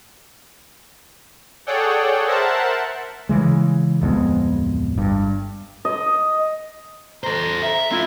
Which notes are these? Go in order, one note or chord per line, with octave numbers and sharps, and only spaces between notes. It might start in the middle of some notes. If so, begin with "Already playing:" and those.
G#4 A4 C#5 D5 F#5 G5
A#4 C5 E5 F#5 A5
C#3 E3 G#3
D1 F2 G#3 B3
G1 G2
D#5
A4 C5 A#5
E5
C4 E4 F4